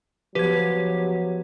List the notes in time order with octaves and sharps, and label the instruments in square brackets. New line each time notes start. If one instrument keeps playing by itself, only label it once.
[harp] F3 B3 [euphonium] F#3 [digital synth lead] G4 [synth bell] B4 G#6